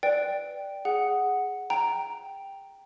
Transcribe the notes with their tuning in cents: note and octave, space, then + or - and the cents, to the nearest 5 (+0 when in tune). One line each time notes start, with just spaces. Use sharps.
B4 +0 D5 +0 G5 +0
G#4 +0 F#5 +0
G5 +0 A#5 +0